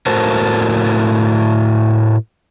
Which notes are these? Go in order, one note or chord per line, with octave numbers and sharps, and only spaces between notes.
A2 F#4 A4 A#4 C5